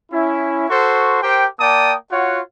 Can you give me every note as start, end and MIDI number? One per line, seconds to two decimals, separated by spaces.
0.12 0.65 61
0.12 0.65 64
0.69 1.21 66
0.69 1.21 69
0.69 1.21 72
0.69 1.21 84
0.69 1.21 85
1.23 1.46 67
1.23 1.46 70
1.23 1.46 72
1.23 1.46 79
1.59 1.94 58
1.59 1.94 74
1.59 1.94 79
1.59 1.94 81
1.59 1.94 87
2.11 2.39 65
2.11 2.39 66
2.11 2.39 73
2.11 2.39 78